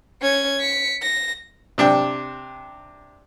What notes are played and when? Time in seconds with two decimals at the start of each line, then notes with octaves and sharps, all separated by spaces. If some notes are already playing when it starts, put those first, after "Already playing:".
0.21 C#4 G#6
0.60 B6 C#7
1.02 A#6
1.78 C3 D4 G5